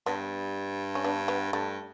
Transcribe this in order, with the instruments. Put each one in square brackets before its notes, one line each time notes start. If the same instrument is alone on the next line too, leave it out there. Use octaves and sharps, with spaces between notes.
[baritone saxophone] G2 [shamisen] B3 D4
[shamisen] C#4
B3 D4
B3
[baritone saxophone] G2 [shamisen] A3